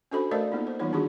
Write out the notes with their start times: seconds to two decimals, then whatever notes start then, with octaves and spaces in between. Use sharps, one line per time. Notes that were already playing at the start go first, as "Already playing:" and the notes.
0.11 C#4 D4 F#4 A4 C5 B5
0.31 A3 A#4 C5 D5 F5 A5
0.52 A#3 B3 D#4 F4
0.67 C5
0.79 E3 G3 B3 D#4 F4 C#5
0.92 D#3 D4 D#4 F4 F#4 G#4